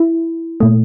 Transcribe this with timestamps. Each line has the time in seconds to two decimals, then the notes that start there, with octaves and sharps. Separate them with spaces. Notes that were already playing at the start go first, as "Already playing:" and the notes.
Already playing: E4
0.60 A#2 A3